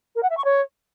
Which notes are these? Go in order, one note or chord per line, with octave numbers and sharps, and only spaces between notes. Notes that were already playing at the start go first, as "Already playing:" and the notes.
A#4
F#5
E5
C#6
C#5